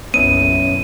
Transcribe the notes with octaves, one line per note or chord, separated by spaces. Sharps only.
F#1 B1 F#2 B3 C#4 E4 D#7